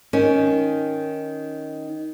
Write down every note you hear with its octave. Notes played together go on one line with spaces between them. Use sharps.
D#3 C#4